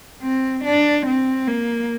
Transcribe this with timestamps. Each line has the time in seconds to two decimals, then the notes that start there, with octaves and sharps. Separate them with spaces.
0.22 C4
0.64 D4
1.06 C4
1.47 A#3